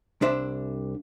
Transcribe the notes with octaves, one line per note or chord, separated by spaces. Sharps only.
C2 D4 C5 E5